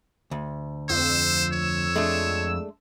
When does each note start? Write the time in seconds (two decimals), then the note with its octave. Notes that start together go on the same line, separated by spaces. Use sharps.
0.31 D2
0.89 F2 C5 E6
1.53 C#5
1.96 G#3 A3 D4